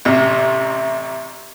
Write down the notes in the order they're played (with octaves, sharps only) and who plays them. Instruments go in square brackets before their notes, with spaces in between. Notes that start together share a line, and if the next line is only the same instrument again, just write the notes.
[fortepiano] A1 C3 [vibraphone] E5